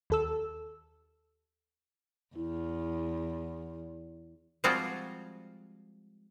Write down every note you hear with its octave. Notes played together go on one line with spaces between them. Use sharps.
D#2 A4 E6
E2 E4
F3 G3 G#3 C4 F4 F#4